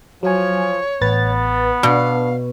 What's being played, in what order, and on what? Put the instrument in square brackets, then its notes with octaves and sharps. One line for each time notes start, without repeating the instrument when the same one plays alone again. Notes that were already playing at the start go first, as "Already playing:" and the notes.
[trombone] F3 [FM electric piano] F#3 G#5 [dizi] C#5
[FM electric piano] A1 B4 A6 [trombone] B3
[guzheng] B2 [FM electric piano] D4 [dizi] F5